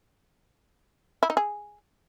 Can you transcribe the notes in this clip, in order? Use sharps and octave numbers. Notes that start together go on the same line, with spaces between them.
E4
D#4
G#4